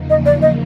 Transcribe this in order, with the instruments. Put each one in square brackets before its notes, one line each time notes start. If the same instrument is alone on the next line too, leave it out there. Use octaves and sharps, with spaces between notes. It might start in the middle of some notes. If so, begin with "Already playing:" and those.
Already playing: [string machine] E2 C#3 F3 A#3 D#4
[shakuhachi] D#5
D5
D#5